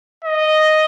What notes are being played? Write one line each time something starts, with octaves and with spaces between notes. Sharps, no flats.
D#5